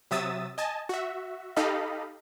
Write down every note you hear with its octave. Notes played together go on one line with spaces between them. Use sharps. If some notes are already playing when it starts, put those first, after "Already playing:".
C3 F#3 E5 D#6 E6 A6
D#5 G#5 A5
F#4 E5
D#4 G4 A4 D#5 F5 B5